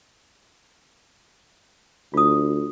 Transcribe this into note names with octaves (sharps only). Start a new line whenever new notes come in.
D2 F4 D#6